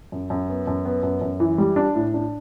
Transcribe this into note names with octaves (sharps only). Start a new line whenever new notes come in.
F#2
F#2
B3
F#2
B3
F#2
F#2
E3
G3
D4
A2
D4